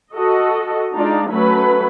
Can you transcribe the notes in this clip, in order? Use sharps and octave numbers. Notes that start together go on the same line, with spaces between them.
F#4 A4 D#5
G#3 D4 D#4 F4 D5
F#3 A3 C#4 B4 B5